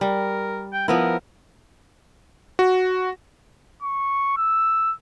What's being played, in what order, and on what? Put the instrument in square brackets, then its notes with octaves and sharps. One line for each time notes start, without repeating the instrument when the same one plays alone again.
[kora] G3 [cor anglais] A#4
[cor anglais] G5
[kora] F3 B3 E4 [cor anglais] A#4
[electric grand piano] F#4
[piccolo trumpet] C#6
E6